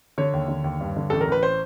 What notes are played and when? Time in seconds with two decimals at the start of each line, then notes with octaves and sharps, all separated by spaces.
0.18 D3 C#5
0.33 D#2
0.48 D3
0.64 D#2
0.80 G2
0.96 D3
1.10 A1 A4
1.21 A#4
1.28 A1 B4
1.43 C5